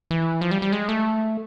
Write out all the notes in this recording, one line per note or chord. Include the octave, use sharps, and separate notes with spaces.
E3
F3
G3
G3
G#3
A3